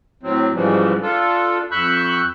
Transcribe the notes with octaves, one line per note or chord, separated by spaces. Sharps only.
A2 F#3 C4
G#2 C#3 E3 F3 G3
D4 F4 A4
F2 B5 C#6 E6 F#6 G6